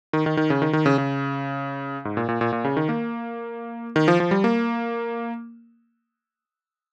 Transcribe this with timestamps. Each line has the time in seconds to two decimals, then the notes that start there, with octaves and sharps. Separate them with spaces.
0.13 D#3
0.26 D#3
0.37 D#3
0.50 C#3
0.62 D#3
0.73 D#3
0.86 C#3
0.98 C#3
2.05 G#2
2.17 A#2
2.29 A#2
2.41 A#2
2.52 A#2
2.65 C#3
2.77 D#3
2.89 A#3
3.96 D#3
4.08 F3
4.20 F3
4.31 G3
4.44 A#3